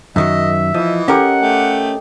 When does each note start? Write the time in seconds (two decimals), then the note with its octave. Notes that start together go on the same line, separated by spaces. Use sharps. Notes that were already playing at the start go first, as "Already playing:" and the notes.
0.16 F#2 D#3 F#3 D#5 E5
0.74 E3 F3 D#5
1.08 C#4 G4 A4 A#4 F#5
1.41 A3 G5